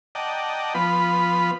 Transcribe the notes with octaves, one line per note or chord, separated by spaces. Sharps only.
D5 D#5 F#5 G5 A5 A#5
F3 B3 F4 B4 B5